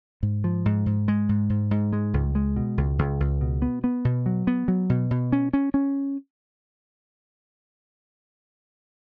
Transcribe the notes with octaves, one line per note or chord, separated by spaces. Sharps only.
G#2
F3
G#2
G#2
G#3
G#2
G#2
G#2
G#3
C#2
G#3
B2
C#2
C#2
C#2
B2
B3
B3
B2
F#3
B3
F#3
B2
B2
C#4
C#4
C#4